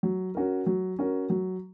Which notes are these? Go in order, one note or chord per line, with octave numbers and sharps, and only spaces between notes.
F#3
C#4 F#4 A#4
F#3
C#4 F#4 A#4
F#3